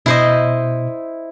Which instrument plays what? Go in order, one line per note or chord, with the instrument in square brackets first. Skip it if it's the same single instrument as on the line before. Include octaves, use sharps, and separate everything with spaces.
[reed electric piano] B2 [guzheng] E4 C5 D#5